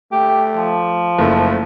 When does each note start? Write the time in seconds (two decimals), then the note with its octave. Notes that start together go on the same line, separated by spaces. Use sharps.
0.12 A3 G4
0.57 F3
1.19 F#1 A3